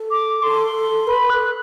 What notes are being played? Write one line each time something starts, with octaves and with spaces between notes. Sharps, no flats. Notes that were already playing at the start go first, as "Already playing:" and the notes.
Already playing: A4
D6
A4 C6
B4 B5
B4
A4 F#6